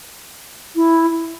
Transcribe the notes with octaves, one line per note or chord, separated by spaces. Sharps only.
E4